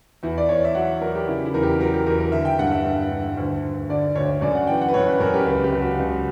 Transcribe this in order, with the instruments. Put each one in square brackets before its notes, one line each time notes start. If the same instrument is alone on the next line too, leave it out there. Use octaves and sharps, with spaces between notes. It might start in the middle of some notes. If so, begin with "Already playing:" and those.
[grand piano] E2 E4
D5
E2 C#5
E5
F#3 F#5
F#3 A#4
G4
C#3 E4
E4
E2 A#4
G4
F#3 A#4
G4
E2 A#4
A#4
D3 E5
G5
G2 F#5
E5
G2
G2
D2
D2
D3 D5
D2 C#5
F#2 D5
F#5
E3 G5
F#5
B4
F#2 C#5
B4
F#2 A#4
G4
C#2 B4
G4
C#2
F#4
C#2